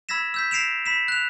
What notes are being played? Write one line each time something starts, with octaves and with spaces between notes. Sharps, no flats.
B5 E6 G#6 A#6 B6 E7
E6 G6 B6
A#6 C7 D7 E7 F7
B5 B6 E7
F#6 F7